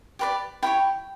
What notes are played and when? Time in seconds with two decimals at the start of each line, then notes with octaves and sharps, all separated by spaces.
0.19 G4 B4 D5
0.63 E4 G4 C#5 G5